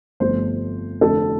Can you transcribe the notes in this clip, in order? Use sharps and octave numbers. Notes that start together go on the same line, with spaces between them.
G1 F2 F3 A3 C5
F1 F2 D3 A4